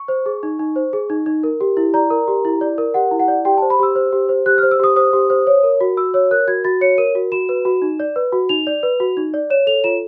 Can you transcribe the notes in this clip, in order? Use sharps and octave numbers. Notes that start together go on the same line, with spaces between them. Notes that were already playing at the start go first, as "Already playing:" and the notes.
Already playing: C#6
C5
G#4
D#4
D#4
C5
G#4
D#4
D#4
A#4
G4
E4
D5 A#5
A#4
G4
E4
D5
A#4
G4 F#5
E4
F#5
D5
G4 G5
A5
C5
B5
G4 E6
C5
G4
C5
G4 F#6
F6
C5
E6
G4 D#6
C5 D#6
G4
C5
C#5
A#4
F#4
F#4 E6
C#5 E6
A#4 F#6
F#4 G#6
F#4 A6
C#5 C#7
A#4 D#7
F#4
F#4 E7
B4
F#4
D#4
D5
B4
F#4
D#4 F7
D5
B4
F#4
D#4
D5
C#5 E7
A4 F7
F4 E7